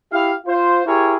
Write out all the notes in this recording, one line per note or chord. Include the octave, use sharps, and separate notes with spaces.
E4 G4 F5
F4 C5
E4 G4 G#4 A#4 C#5